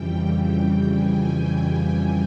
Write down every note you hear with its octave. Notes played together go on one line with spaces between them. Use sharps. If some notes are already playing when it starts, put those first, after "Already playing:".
Already playing: F2 C#3 E3 G3 G5
G#5